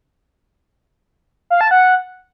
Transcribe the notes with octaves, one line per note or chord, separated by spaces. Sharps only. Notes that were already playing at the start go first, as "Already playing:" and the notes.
F5
A5
F#5